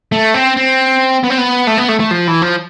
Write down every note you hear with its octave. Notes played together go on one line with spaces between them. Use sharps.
A3
C4
C4
B3
C4
B3
A3
B3
A3
A3
F3
E3
F3